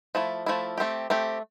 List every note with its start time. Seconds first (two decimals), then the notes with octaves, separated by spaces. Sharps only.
0.15 F3 A3 E4
0.46 F3 A3 E4
0.78 A3 C4 G4
1.10 A3 C4 G4